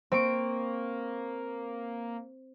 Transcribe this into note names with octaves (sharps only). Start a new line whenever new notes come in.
A#3 C4 C#6 D7